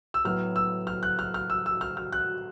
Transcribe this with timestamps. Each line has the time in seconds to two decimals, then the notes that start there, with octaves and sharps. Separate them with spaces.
0.14 E6
0.25 A2 F#3 B3 F6
0.56 E6
0.87 F6
1.03 F#6
1.19 F6
1.34 F6
1.50 E6
1.66 E6
1.81 F6
1.97 F6
2.12 F#6